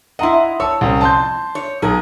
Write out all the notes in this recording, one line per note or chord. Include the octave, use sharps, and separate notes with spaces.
E4 D#5 F#5 A#5 C6
C#5 A5 E6
C2 C#4
F2 A5 C6 G6
C#5
B1 G#4 A#4